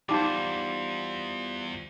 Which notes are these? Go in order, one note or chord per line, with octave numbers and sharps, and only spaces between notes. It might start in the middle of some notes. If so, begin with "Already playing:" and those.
E2 G3 D#4 F4 C5 D6